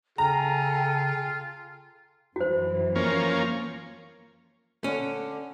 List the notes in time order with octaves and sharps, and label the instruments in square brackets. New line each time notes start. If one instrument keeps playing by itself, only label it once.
[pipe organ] C#3 [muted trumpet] F4 [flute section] A4 G5 G#5 [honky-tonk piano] A#5
[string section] F#2 E3 [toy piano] F#4 C5
[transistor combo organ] F3 A#3 C#4
[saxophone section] D3 [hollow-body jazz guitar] C#4